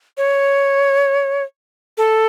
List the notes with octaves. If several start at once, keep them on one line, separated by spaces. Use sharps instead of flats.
C#5
A4